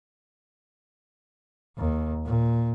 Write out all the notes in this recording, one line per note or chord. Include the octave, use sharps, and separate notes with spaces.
D#2
A#2